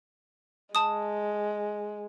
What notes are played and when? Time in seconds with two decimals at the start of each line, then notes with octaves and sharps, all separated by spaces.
0.75 G#3 A5 D#6